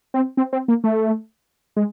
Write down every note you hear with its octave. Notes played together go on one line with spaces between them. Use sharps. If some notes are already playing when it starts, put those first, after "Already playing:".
C4
C4
C4
A#3
A3
G#3